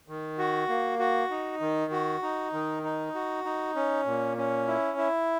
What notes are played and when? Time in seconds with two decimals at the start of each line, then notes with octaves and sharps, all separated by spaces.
0.08 D#3
0.38 F#4
0.69 A#3
0.99 F#4
1.31 D#4
1.60 D#3
1.92 F#4
2.23 D#4
2.53 D#3
2.84 D#4
3.15 F#4
3.45 D#4
3.76 C#4
4.06 A#2
4.37 C#4
4.67 E4
4.98 E4